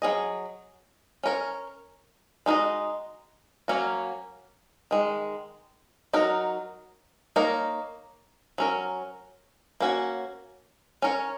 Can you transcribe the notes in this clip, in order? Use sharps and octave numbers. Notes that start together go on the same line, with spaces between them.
F#3 C#4 G#4 D#5
C#4 A#4 C#5
G#3 D#4 F#4 A#4 D#5
F#3 A#3 C#4 F#4
D#3 G#3
F#3 D#4 F#4 A#4
A#3 D#4 A#4 C#5
F#3 C#4 A#4
A#3 C#4 F#4 C#5
C#4 A#4 C#5